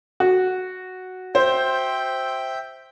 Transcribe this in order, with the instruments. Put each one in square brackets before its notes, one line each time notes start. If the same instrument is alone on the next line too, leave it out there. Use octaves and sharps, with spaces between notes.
[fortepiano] F#4
[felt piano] C5 [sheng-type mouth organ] E5 G5 G6